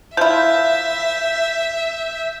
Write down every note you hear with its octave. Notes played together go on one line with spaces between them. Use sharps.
F3 E4 E5 G6